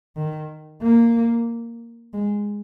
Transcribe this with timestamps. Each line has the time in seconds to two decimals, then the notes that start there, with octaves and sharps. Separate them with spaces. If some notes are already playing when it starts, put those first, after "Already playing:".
0.16 D#3
0.82 A#3
2.13 G#3